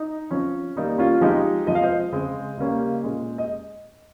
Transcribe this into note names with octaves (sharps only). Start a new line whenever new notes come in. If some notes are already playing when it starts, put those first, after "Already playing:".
Already playing: D#4
F3 C4 C#4
D#3 G3 A#3 D#4
C#4 F4
F3 G#3 C4 D#4 G4
F3 G#3 C4 D#5
F5
C5 D#5
C#3 G#3 C4
C#3 G3 A#3 C#4
A#2 G#3 C#4
D#5